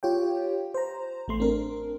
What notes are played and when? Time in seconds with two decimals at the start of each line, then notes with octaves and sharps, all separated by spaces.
0.03 F4 G4 C#5 G5
0.74 C5 A#5
1.28 A1 A3 C6
1.40 C4 D4 A#4